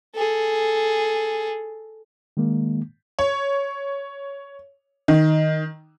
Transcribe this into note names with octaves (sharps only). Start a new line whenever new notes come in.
G#4 A4
D#3 G#3 A#3
C#5
D#3